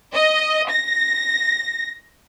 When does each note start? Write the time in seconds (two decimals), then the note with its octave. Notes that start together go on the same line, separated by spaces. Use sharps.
0.14 D#5
0.70 A#6